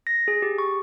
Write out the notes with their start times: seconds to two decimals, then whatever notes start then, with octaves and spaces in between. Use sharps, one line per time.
0.07 A#6
0.28 G#4
0.42 G4
0.58 C#6